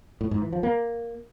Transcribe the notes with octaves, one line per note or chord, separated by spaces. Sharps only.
A2
G#2
E3
F3
A#3